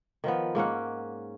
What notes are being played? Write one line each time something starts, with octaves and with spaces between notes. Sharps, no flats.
D#3 F3 B3
G#2 A#3 C#4 F#5